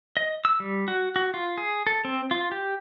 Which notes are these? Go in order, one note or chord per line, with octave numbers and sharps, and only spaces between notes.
D#5
E6
G3
F#4
F#4
F4
G#4
A4
C4
F4
G4